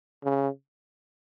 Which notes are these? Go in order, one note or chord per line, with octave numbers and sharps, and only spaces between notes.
C#3